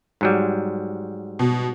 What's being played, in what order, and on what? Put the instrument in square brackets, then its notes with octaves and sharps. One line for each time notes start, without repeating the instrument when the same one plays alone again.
[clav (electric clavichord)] G#2 F#3 G3
[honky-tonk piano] B2